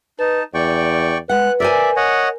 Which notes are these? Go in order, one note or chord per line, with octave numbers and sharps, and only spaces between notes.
D#4 B4 A5
E2 D5 G5 C#6
G#3 B4 F#5 F#6
A#4 C5 D5 E5 G#5
C#5 D#5 F#5